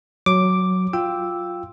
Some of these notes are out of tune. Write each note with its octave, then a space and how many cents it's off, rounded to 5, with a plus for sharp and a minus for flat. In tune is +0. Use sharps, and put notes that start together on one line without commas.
F#3 +0 C#5 +0 D6 +0
F4 +0 G5 +0 E6 +0